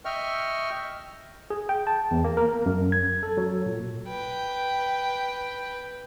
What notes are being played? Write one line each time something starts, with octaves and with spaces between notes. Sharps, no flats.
D#5 E5 G5 C#6 F6
G#4
G5
A5
E2
A#3
A#4
F#2
G#6
A4
F#3
A#2
B4 G5